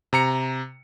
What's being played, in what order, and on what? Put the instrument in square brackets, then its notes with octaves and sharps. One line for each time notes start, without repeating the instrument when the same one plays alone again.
[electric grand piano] C3 A#5 C#7